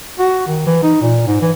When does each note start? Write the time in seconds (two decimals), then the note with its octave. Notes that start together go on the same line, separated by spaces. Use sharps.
0.19 F#4
0.47 D#3
0.66 E3
0.83 D#4
1.02 A#2
1.27 G#2
1.42 E3